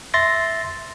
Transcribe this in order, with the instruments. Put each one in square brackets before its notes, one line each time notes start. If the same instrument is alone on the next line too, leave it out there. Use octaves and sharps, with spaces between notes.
[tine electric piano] E5 C6 A6 A#6